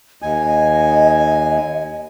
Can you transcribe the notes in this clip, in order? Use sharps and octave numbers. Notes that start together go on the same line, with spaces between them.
D#2 D#5 G#5